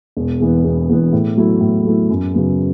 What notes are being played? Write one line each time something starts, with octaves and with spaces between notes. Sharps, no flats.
E1
E2 E3 B3
E1
E2 E3 B3
A2
F#3 A3 E4
A2
F#3 A3 E4
F#2
C#3 F#3 B3